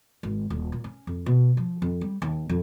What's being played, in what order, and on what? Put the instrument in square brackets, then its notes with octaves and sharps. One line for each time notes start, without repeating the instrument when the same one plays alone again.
[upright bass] G#1
D#1
A#2
C#4
F2
B2
F3
F2
G3
D#2
F2